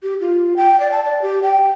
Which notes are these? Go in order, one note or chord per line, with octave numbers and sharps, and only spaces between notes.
G4
F4
G5
D5
A5
D5
G4
G5